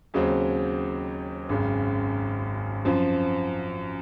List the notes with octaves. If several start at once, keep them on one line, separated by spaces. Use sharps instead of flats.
D#2 C#3 F#3 C4
G#1 F#2 C#3
F#2 F3 C4